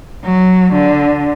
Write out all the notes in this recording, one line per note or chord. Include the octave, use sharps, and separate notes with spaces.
F#3
D3